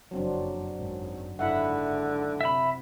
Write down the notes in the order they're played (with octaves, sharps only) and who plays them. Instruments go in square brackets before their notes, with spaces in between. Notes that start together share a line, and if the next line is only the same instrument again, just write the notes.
[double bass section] F#1 F2 [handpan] F#3 C4 D4
[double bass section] G#1 F#2
[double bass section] F#1 G#2 [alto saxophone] D3 [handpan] E4 E5 F#5
[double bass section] C3 [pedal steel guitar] E5 B5